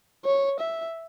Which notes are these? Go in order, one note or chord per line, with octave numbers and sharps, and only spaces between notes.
C#5
E5